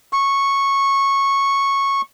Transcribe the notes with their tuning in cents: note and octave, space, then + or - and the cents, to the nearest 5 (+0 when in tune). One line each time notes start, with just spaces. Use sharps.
C#6 -10